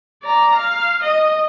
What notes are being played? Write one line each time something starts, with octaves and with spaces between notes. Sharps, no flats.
D5 A#5
F5
D#5